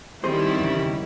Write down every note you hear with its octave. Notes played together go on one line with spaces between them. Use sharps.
D#3 G3 C4 E4 G#4 C5
E2 C#3